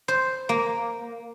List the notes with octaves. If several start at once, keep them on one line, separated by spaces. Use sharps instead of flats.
C5
A#3